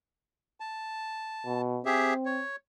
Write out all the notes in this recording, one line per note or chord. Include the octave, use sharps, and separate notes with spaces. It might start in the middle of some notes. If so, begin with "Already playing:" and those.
A5
B2
C4 G4 G#4 E5
C#5